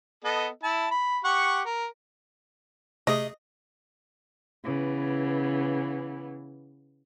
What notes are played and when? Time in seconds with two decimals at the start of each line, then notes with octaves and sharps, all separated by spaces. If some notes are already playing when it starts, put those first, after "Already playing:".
0.24 B3 A4 D#5
0.63 E4 A5
0.91 B5
1.24 G4 F#5 C#6
1.65 A#4
3.07 C3 A3 G#4 D#5
4.63 C#3 E3 B3